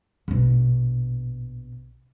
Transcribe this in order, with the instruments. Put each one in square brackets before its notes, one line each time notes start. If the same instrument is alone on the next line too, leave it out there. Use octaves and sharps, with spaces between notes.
[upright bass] A#1 B2